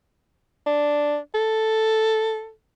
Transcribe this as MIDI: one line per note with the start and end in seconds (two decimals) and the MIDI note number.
0.66 1.17 62
1.34 2.51 69